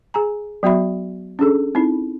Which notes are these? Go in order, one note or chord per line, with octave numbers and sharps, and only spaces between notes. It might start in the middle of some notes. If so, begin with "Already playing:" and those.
G#4 G#5 A#5
F#3 B3 F#4 E5 B5
C#4 D4 G#4 A4
C4 D#4 E4